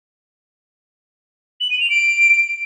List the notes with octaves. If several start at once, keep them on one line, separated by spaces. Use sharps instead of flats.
F#7
D#7
F7
D7